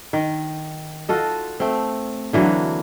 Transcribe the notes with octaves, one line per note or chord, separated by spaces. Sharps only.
D#3
F4 F#4 A4 D#5
A3 C4
D3 E3 F#3 A#3